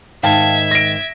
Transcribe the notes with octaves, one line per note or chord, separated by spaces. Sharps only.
G#2 D#3 E5 F5 G5 A5 G#6
A#6 D7